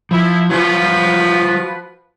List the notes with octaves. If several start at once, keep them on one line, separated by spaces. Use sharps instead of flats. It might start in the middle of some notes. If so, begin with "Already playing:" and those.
F3 E4
F3 F#3 F4 F#4 B4 C5